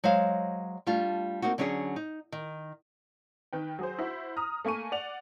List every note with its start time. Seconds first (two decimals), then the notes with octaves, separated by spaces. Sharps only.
0.04 F#3 G#3 C5 F5
0.86 G3 A3 D4 F4
1.42 A#3 C4 D#4 F#4
1.58 D3 F#3 C#4 D4 G#4
1.96 D#4
2.32 D#3
3.53 D#3 B4 G5
3.79 F#3 G#4 C5
3.99 E4 F#4 C5
4.37 A#5 D#6 F6
4.65 A3 A#3 G#5 C#6 D#7
4.92 D5 F#5 F7